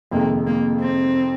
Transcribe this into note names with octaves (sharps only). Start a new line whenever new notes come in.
F2 C3 D#3 G#3 A#3
A#3
C4